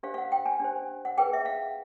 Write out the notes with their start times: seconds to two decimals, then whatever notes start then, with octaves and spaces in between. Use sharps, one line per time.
0.03 D4 G4 C5 F5
0.14 F5
0.18 F#5
0.32 G5
0.46 G#5
0.60 D4 G4 C5
1.05 F#5
1.17 D#4 G#4 B4 G5
1.33 E5
1.45 F5